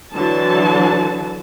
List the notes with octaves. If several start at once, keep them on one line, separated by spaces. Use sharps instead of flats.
D3 E3 F#3 A5